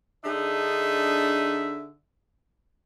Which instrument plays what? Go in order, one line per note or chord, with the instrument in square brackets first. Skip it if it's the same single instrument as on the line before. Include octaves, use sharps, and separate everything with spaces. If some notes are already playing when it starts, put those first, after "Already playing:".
[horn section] D3 D4 D#4 G#4 E5